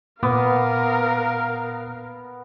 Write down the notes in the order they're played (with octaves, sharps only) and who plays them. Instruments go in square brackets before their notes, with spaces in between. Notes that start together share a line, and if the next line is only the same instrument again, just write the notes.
[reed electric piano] A#2 D6 [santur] B3 [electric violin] A#4 F5